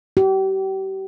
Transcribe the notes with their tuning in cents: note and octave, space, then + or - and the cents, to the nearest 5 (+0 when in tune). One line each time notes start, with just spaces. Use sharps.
G4 -35